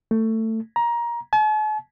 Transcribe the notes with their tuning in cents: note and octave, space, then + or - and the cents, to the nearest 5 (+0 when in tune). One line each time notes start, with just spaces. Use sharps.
A3 +20
A#5 +20
A5 -45